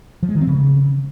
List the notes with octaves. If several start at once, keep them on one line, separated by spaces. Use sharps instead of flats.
F3
G#3
D#3
C4
C#3